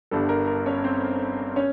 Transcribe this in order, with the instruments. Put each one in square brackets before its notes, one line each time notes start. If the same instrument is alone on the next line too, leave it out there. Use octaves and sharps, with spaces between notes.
[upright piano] G1 G2 D3 G3 A4
A#4
A#4
C#4 C#5
C4 C5
C#4 C#5